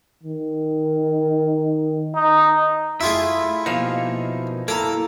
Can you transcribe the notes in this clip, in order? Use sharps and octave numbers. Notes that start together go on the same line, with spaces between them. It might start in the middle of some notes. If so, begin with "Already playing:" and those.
D#3
D#4
A3 E4 F4 G#4 E5
B2 F3 A#3 D#4 F5
A#3 E4 A4 A#5